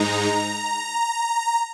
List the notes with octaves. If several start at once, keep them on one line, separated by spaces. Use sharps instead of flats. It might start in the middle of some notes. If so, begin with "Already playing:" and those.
Already playing: G#2 G#3 D#4 A#5